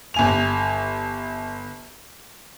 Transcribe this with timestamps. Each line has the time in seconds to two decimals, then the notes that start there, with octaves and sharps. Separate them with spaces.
0.14 G1 G#5 F7